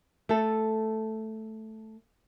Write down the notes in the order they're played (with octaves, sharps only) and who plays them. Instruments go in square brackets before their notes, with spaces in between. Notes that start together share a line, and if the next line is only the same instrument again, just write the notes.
[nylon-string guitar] A3 A4